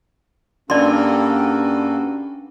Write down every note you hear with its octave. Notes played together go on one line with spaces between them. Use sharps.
G2 A#3 C#4 F#4 A4 D5 C6